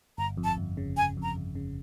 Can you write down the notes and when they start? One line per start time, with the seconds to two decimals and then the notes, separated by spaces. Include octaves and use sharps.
0.18 G1 A#5
0.37 F2
0.44 A5
0.58 G1
0.77 C#3
0.97 G1 G#5
1.17 F2
1.23 A#5
1.37 G1
1.55 C#3